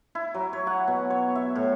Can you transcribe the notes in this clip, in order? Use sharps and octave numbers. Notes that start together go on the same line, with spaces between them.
E4
F#3
C#5
F#5
B2
C#5
E5
A2